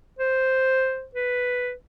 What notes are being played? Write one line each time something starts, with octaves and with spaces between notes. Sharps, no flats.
C5
B4